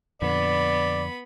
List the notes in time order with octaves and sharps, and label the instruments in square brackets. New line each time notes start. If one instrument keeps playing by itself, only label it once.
[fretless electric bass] F2 A#2 D3 [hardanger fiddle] B3 B5 [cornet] D5